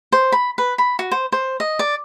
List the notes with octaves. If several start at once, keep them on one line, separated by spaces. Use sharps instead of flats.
C5
B5
B4
B5
F#4
C5
C5
D#5
D5